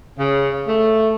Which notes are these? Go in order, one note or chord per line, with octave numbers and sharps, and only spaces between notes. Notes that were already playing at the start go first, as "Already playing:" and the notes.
C#3
A3